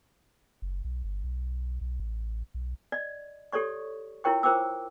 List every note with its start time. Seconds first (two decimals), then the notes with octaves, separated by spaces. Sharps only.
0.62 F#1
0.84 B1
1.04 G1
1.24 B1
1.81 B1
2.00 A1
2.54 B1
2.92 D5 D#5
3.53 G4 A4 C#5 D5 C#6
4.24 E4 F4 A#4 C#5 G5 C#6
4.43 F4 A#4 C5 G5 D6 E6